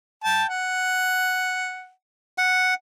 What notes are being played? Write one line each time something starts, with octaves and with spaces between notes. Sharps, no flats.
G5 A5
F#5
F#5